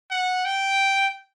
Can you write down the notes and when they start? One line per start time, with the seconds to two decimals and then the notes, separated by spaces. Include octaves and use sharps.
0.11 F#5
0.45 G5